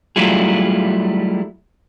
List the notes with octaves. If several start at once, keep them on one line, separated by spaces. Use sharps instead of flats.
F#3 G3 A3 E4 F4 G#4